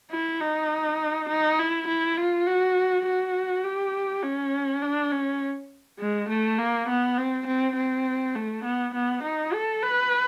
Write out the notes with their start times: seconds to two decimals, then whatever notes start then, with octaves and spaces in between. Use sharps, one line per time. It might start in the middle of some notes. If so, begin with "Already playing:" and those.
0.11 E4
0.40 D#4
1.29 D#4
1.59 E4
1.88 E4
2.18 F4
2.47 F#4
3.06 F#4
3.64 G4
4.23 C#4
4.82 D4
5.12 C#4
6.00 G#3
6.29 A3
6.58 A#3
6.89 B3
7.18 C4
7.47 C4
7.76 C4
8.35 A3
8.64 B3
8.94 B3
9.23 D#4
9.54 A4
9.82 B4